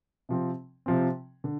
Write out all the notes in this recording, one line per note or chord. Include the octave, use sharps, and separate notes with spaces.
C3 F3 C4
C3 F3 C4
D3